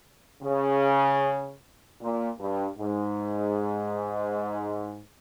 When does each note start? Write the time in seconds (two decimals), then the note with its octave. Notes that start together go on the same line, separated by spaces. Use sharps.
0.43 C#3
2.00 A#2
2.39 G2
2.78 G#2